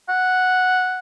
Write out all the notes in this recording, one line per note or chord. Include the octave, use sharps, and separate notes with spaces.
F#5